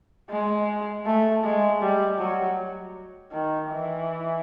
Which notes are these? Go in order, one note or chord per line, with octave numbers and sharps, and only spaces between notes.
G#3
A3
G#3
G3
F#3
D#3
E3